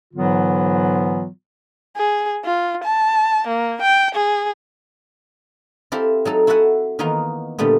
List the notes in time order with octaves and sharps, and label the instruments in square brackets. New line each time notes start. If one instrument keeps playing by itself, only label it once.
[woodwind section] G#2 D3 E3 F#3 B3 F4
[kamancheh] G#4
F4
A5
A#3
G5
G#4
[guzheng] C4 E4 G4 A4 C5 F5
F#3 D#4 A4
E4 F#4 A4 E5 F#5 G#5
D#3 E3 A#3 B3 D#4 F5
A#2 D3 G3 A3 B3